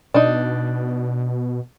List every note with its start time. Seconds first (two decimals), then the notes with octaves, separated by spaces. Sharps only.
0.14 B2 D4 D#4